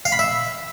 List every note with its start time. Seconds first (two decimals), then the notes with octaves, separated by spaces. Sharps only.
0.05 F5
0.12 B5
0.19 E5